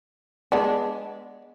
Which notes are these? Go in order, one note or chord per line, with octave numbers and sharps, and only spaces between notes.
G#3 B3 D4